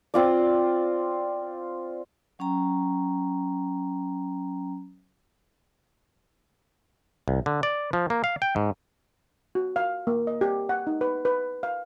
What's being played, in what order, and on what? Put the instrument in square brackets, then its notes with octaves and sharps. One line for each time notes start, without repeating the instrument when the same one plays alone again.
[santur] C4 F4 D5
[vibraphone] F#3 C#4 G5 A#5
[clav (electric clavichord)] C2
D3
D5
F3
A#3
F5
G5
G#2
[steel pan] F#4
F5
A#3
D#5
G4
F#5
D#4
B4
B4
F5